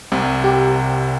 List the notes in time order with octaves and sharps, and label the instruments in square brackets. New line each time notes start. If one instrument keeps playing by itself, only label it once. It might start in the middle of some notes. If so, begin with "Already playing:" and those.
[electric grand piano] C2 C3 G3
[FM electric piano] G4